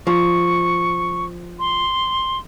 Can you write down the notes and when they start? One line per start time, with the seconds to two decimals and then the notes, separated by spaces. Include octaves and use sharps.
0.07 F3 C#6
1.59 C6